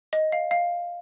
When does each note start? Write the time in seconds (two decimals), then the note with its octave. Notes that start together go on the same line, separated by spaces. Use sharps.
0.13 D#5
0.32 F5
0.51 F5